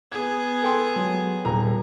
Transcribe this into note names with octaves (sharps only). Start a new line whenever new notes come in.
B3 G#4 G#6
A4 G5 C6
F#3
D#1 A#5